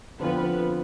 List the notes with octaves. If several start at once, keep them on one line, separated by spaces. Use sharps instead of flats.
D3 F3 B3 C4 F4 B4